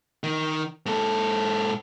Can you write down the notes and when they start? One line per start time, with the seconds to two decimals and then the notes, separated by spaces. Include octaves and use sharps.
0.24 D#3
0.86 G#2 A4